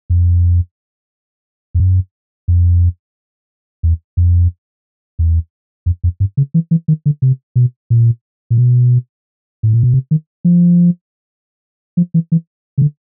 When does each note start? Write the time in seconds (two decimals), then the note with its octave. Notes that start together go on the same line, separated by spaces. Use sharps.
0.10 F2
1.75 F2
1.80 F#2
2.48 F2
3.83 E2
4.17 F2
5.19 E2
5.86 F2
6.04 F2
6.20 G2
6.37 C#3
6.54 E3
6.71 E3
6.88 D#3
7.06 D3
7.22 C3
7.56 B2
7.90 A#2
8.50 A#2
8.57 B2
9.63 A2
9.73 A#2
9.83 B2
9.94 C3
10.11 D#3
10.45 F3
11.97 F3
12.14 E3
12.32 E3
12.78 C#3
12.82 D3